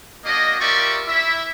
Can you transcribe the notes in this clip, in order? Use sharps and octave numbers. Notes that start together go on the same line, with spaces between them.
A#3 D4 F#4 D#5
F4 G4 A#4 D5 E5 C#6
E4 E5